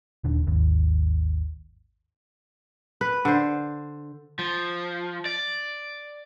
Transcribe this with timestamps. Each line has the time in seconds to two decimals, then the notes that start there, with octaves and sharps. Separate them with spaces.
0.24 D#1 D3
0.47 G#1 D#2
3.01 B4
3.25 D3 C5
4.39 F3
5.26 D5